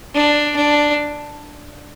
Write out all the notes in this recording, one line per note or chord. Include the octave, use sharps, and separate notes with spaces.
D4
D4